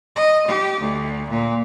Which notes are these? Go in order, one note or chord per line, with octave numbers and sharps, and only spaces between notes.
D#5
G4
D2
A#2